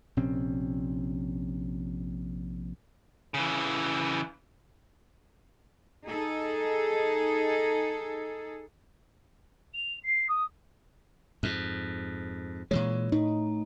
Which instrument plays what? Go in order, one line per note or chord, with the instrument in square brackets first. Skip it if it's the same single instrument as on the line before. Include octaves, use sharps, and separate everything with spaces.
[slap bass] A#1 C3 C4 C#4
[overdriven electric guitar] C#3 E3
[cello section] D#4 G#4 A4
[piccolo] F7
C7
D#6
[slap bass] F2 G#2
[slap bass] A#2 E3 G#3 [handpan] C#5
[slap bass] A2 [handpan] D#4